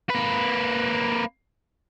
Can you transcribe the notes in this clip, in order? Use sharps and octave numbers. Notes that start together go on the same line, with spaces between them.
A#3 B4